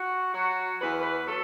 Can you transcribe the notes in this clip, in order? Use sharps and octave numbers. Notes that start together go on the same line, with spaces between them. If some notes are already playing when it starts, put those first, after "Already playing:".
Already playing: F#4
F#3 F#4
E2 B4
B4
F#3 A4